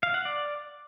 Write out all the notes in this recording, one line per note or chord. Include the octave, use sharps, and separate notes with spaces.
F5
F#5
D5